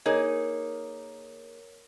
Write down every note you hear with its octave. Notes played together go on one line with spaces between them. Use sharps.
A#3 D#4 G#4 A#4 C#5